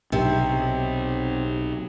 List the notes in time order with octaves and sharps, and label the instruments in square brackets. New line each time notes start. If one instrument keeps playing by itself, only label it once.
[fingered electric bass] B1 [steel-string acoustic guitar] C3